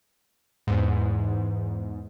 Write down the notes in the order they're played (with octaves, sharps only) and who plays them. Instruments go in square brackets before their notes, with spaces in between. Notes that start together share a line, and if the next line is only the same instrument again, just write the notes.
[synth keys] E2 G#2